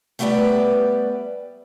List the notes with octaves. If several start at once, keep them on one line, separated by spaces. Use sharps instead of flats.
G3 A3 B3 G4 B4 D5